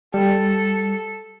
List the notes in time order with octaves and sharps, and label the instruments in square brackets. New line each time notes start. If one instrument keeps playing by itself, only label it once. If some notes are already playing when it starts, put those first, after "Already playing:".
[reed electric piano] G3 [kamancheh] A4